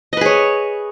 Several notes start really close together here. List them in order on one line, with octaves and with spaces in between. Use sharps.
D#5 B4 G#4 C#5